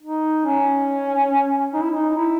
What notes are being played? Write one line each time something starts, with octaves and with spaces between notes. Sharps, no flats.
D#4
C#4
D#4
E4
D#4
E4